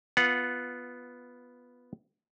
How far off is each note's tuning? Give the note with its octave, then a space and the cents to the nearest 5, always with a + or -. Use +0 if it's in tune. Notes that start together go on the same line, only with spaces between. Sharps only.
B3 +0 F4 +0 F#5 -10